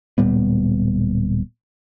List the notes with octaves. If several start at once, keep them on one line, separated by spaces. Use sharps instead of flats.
D1 A#2 G3 B3